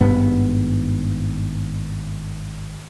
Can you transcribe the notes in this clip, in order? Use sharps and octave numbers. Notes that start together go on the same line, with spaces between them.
G#1 G2 B3